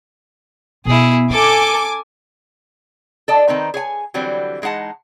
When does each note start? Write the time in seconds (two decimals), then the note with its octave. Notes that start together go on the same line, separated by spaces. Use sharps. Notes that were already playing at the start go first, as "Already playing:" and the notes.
0.85 B2 B3 E4 G#4
1.30 C#4 A4 G#5 D6
3.28 A4 D5 D#5
3.48 D#3 C4 D#4 B4
3.74 G#4 C#5 G#5
4.14 D3 E3 F#3 G3 C4
4.62 E3 G#3 D#4 F#5 A5